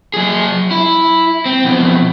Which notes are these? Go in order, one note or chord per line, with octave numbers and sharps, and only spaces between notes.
F#3 G#4
E4
C4
F2 B2